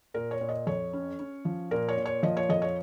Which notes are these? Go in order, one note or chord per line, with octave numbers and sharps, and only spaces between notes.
A#2 A#4
C#5
A#2
D#5
F2 C#5
C#4
C#4
F3
A#2 A#4
C#5
A#2
C#5
F3 D#5
C#5
F2 D#5
C#5